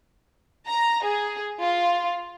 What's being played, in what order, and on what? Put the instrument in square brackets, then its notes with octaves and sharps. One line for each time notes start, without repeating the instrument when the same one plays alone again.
[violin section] A#5
G#4
F4